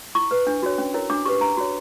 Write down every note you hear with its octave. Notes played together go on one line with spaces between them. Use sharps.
E4 C#6
B4
D4
F#4 C#5
C#4
E4 A#4 C#5
D4 D6
G4 B4 C#6
D4 A#5
F#4 C#5